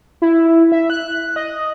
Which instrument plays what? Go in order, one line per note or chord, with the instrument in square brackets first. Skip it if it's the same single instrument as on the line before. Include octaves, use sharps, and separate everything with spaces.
[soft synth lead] E4
E5
F#6
D#5